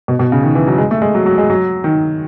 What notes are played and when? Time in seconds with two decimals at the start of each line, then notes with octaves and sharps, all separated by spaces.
0.08 B2
0.19 B2
0.32 C#3
0.43 D#3
0.55 E3
0.67 F#3
0.78 G#3
0.91 A3
1.02 G#3
1.15 F#3
1.26 F#3
1.38 G#3
1.50 F#3
1.84 D#3